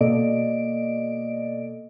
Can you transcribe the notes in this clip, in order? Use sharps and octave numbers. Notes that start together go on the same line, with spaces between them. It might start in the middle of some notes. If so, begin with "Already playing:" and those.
B2 A#3 A4 D5 D#5 D7